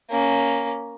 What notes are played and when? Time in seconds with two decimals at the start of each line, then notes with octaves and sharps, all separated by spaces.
0.10 A#3 C#4